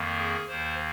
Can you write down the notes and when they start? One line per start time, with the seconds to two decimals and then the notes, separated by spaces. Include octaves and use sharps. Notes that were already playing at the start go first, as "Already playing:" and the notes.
Already playing: F2 D#3 A#3
0.17 G#4
0.48 D#2 D#3 A#3 C5